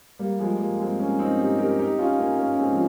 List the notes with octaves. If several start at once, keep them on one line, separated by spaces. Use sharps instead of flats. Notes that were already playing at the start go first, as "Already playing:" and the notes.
G3 A#3
F3 G#3
G3 A#3
G#3 C4
A#3 C#4
C4 D#4
D#4 G4
G4 A#4
D#4 G4
C#4 F4
A#3 C#4
A#3 C#4
C#4
G#3 C4
F3